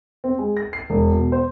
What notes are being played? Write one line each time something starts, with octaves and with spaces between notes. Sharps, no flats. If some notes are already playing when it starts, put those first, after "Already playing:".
C4
G#3
A#6
C7
E1
B2
C5